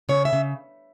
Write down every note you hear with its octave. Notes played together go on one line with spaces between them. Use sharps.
C#3 C#5
E5
C#3